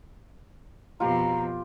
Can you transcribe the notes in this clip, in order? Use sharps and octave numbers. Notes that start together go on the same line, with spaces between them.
F2 B2 F4 G4 A#5